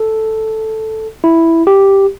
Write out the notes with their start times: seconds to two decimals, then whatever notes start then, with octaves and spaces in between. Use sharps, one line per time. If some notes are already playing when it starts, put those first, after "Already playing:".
Already playing: A4
1.24 E4
1.67 G4